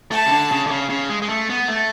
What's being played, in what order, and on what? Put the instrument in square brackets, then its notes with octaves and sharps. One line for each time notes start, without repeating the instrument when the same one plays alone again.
[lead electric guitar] A3 [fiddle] A5
[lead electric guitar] C#3
D3
C#3
D3
C#3
C#3
G#3
G#3
A3
B3
A3